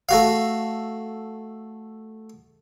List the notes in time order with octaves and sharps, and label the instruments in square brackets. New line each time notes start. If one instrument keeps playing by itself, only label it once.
[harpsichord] A3 F#4 F5